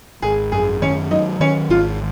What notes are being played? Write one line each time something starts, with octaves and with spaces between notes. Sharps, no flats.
G#1 G#4
F#2 G#4
D#3 C#4
F#3 D#4
D#3 C#4
G#1 F4